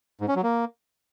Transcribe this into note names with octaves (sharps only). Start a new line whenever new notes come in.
G#2
C#4
F#3
A#3